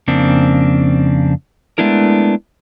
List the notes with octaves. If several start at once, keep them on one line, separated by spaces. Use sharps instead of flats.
F2 C#3 A#3 C4 D4
G#3 A3 B3 D4 E4 A#4